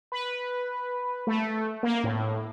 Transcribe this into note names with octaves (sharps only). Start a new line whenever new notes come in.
B4
A3
A#3
A2